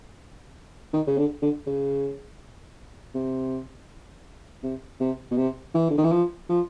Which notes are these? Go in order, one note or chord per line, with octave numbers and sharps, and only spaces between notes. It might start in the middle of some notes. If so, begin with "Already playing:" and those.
D#3
C#3
D3
D3
C#3
C3
C3
C3
B2
C3
E3
D3
D#3
E3
F3
F3